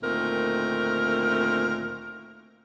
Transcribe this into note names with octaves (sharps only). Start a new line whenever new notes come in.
D2 A#2 D#3 A3 C4 A#4